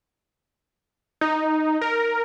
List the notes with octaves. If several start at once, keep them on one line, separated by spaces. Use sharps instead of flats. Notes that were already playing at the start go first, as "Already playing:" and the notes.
D#4
A#4